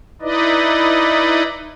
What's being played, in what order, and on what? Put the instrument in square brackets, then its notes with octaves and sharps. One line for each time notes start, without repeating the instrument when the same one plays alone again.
[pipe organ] D#4 E4 B4 D5 D#5